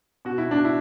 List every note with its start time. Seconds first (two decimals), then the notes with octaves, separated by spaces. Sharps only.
0.25 B2 F#4
0.38 E4
0.48 B2 D4
0.65 E4